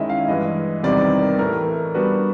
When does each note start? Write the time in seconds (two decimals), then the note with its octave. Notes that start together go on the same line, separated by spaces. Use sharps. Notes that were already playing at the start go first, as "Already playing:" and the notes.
Already playing: D#3 G#3 C#4 E4 D#5 E5
0.10 F5
0.28 G2 E3 G#3 D#5
0.83 E2 C3 D#3 G3 C4 D5
1.21 A#4
1.38 A2 E3 A3 A#4
1.94 G3 B3 D4 F#4 B4